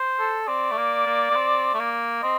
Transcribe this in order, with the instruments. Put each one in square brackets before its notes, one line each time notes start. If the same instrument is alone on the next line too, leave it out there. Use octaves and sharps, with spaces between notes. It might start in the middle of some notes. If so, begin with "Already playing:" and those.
Already playing: [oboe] C5
[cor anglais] A4
[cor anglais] C4 [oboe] D5
[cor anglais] A3
A#3
A#3
A#3
C4
A3
A#3
[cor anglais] C4 [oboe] D#5